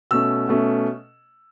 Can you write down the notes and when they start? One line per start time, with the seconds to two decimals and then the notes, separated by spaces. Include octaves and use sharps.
0.11 B2 A3 C#4 E6
0.49 B2 A3 C#4